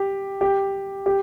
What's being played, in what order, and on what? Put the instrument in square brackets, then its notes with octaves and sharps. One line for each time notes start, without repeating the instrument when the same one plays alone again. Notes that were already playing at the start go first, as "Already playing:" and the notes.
Already playing: [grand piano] G4
G4
G4